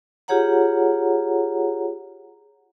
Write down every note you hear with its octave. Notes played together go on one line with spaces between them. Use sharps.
F4 G4 G#4 C#5 F#5 A#5